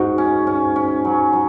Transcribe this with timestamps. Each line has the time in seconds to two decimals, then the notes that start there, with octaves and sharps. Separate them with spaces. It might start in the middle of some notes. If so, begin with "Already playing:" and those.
Already playing: G#2 D#4 F#4
0.18 C#4
0.47 C#4
0.76 C#4
1.05 F#3
1.33 F#3